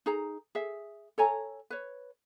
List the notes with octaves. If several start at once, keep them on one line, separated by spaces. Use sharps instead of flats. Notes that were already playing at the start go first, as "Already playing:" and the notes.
D#4 G#4 A#5
G#4 E5
A4 C#5 G#5 A#5
B4 C#5